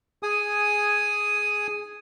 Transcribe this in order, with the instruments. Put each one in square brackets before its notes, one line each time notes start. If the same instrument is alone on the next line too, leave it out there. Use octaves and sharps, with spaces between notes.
[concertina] G#4 G#5 D#6